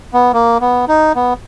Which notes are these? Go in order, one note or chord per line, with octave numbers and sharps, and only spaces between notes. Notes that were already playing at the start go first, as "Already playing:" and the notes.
B3
A#3
B3
D#4
B3